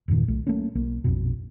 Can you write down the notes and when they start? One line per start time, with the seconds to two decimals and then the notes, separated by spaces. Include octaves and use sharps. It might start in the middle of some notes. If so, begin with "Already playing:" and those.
0.08 E1 G2 A#2 D#3
0.28 B1 A3
0.47 F#3 A3 A#3 C#4
0.75 B1 A#3
1.04 A#1 F2 B2